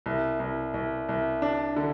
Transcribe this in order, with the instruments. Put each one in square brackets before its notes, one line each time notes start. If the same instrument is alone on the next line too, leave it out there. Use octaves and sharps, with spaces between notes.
[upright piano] C2
C2
C2
C2
D4
D3